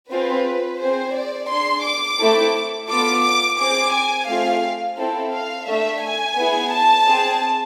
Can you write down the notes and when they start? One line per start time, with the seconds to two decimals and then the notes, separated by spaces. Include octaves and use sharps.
0.10 C4 F4 G#4 B4
0.80 C4 G#4 C5
1.15 D5
1.49 D4 G#4 C6
1.84 D6
2.19 A3 C4 E4 A4
2.88 B3 F4 A4 D6
3.23 D6
3.58 C4 G#4 D6
3.93 G#5
4.28 A3 C4 F4 G#4 F5
4.98 C4 E4 A4
5.32 F5
5.67 A3 D4 A4 E5
6.02 G#5
6.36 B3 E4 G#4
6.72 A5
7.07 C4 G#4